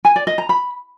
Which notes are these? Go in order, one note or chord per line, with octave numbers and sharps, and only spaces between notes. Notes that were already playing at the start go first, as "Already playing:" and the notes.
G#5
D5
D#5
A#5
B5